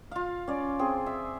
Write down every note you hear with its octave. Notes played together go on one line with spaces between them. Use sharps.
F4 F5
C#4 D5
C4 G#4
E5